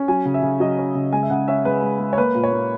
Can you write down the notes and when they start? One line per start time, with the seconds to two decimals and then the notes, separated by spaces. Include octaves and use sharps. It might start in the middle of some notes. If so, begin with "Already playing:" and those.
Already playing: C#4
0.08 F#3 G#5
0.25 C#3
0.34 E5
0.42 C#3
0.60 F#3 D#5
0.78 C#4
0.95 C#3
1.13 G#3 G#5
1.23 E5
1.30 C#3 F#5
1.48 C#4 E5
1.65 G#3 B4
1.82 G#3
1.99 G#3
2.13 C#5
2.18 A#3 B4
2.35 A#2
2.44 C#5
2.52 A#3